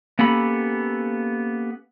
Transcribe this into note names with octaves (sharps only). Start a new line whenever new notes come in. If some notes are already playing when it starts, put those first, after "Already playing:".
A#3 B3 C#4 G4 A4 B5